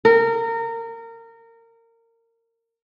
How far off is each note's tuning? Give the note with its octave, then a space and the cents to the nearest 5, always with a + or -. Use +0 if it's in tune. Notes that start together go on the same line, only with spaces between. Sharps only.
A#4 -25